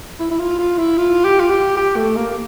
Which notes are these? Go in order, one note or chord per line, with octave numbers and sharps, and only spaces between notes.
E4
E4
F4
F4
E4
F4
G4
F4
G4
G4
A3
A#3